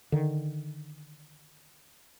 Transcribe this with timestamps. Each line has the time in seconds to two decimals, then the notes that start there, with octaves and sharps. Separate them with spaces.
0.12 D3 D#3